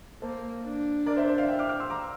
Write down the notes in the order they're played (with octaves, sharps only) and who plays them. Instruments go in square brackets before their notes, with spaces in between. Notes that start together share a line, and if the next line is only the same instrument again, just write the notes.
[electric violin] A#3 [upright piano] A4 C5
[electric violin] D4
[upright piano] A#4 D5
C5 E5
C5 E5
D5 F5
E5 G5
D6 F6
D6 F6
C6 E6
A#5 D6